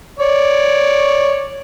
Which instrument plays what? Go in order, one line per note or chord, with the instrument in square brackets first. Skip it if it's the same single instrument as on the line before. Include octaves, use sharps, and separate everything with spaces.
[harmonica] C#5 D5